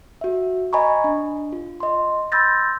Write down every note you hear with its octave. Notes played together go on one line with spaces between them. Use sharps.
F#4 E5
D#5 G#5 A#5 B5 C#6
D4
F4
D#5 C6
B5 C6 E6 G6 A6 A#6